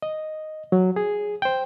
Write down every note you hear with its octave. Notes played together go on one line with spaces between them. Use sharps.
D#5
F#3
G#4
C5 G5